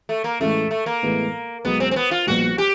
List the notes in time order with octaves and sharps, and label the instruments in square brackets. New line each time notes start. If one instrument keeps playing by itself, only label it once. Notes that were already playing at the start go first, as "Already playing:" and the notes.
[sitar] A3
A#3
[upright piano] A2 E3 G#3 C#4 [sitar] A3
[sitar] A3
A#3
[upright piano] A2 E3 G#3 B3
[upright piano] B1 B2 G#3 [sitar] B3
[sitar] C4
C4
B3
F4
[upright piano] A#1 A#2 G3 B3 [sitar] F#4
[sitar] G4